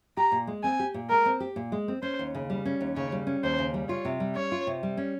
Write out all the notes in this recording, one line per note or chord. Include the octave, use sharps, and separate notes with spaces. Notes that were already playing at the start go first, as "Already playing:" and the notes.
G4 A#5
A#2
G#3
C4 G#5
G4
A#2
G#3 A#4
C4
G4
A#2
G#3
C4
C#4 C5
D#2
C#3
G3
C#4
D#2
C#3 C#5
G3
C#4
D#2 C5
C#3
G3
F4 C#5
C3
G3
C#4 C#5
F4
C3
G3
C#4